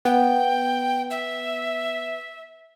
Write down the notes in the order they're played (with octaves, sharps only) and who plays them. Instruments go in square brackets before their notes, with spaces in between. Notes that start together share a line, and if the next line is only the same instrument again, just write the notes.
[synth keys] B3 [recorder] G5
[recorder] E5